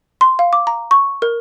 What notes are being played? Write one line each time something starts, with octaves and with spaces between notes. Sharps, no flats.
C6
F5
D6
A#5
C#6
A#4